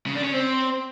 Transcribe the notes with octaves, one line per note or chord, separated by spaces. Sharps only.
C#3
D4
C#4
C4